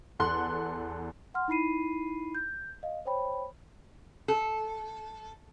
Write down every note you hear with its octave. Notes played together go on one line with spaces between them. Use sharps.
E2 A4 F#5 C6 F#6
F#5 C6 F6
D#4 E4 B5 C7 D#7
G6
D#5 F5
C5 C#5 G5 B5
A4